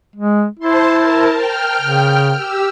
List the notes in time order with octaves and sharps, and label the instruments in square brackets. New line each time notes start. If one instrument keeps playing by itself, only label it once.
[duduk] G#3
[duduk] E4 [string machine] C5 A5 C6
[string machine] A#4 A5
G5 F6
[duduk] C#3
[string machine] G4 E6